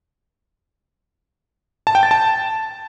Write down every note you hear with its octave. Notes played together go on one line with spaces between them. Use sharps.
A5
G5
A6
A5